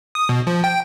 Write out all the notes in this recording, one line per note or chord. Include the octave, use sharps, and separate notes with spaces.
D#6
B2
F3
G5